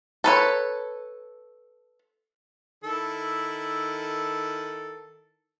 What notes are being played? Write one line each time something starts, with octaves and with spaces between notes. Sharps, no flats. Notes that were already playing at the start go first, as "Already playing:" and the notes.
A4 B4 C#5
D#3 E4 A4